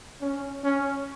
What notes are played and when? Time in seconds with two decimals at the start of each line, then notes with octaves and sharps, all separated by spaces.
0.21 C#4
0.64 C#4